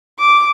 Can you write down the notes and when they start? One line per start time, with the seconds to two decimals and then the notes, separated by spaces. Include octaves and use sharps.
0.19 D6